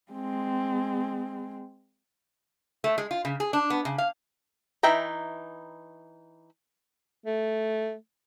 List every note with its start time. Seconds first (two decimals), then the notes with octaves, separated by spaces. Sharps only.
0.12 G#3 C4
2.84 A3
2.98 G#3
3.11 F4
3.25 C#3
3.40 G#4
3.53 D4
3.70 B3
3.85 C#3
3.98 F5
4.83 E3 D#4 E5 G5 A#5
7.26 A3